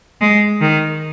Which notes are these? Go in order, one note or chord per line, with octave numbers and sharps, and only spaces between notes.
G#3
D#3